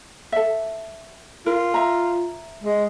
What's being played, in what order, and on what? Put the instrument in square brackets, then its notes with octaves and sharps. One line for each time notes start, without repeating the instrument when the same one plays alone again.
[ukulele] A4 E5
[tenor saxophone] F4 [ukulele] A#4
[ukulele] E5 A#5
[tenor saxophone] G#3